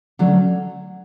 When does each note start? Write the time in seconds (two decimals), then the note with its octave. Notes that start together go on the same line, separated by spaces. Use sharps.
0.19 D3 F#3 A3 C#4